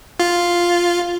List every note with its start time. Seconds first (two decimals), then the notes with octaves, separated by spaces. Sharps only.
0.20 F4